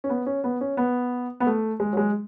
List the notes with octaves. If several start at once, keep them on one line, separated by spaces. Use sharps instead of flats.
C#4
B3
C#4
B3
C#4
B3
B3
A3
G#3
F#3
G#3